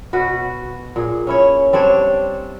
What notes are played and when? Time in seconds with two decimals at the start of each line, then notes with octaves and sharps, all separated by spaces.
0.13 B2 F#4 B4
0.96 A#2 G#4
1.27 C#4 E4 C#5
1.73 G3 C4 D4 C#5